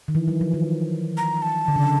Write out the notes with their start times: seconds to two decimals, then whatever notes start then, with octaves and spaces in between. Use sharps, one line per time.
0.08 D#3
0.15 E3
0.28 F#3
0.41 F3
0.54 D#3
1.17 A#5
1.42 A5
1.68 D3
1.76 C#3